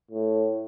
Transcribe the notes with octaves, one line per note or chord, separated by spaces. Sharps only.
A2